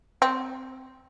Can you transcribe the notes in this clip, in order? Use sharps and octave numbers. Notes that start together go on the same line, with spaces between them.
C4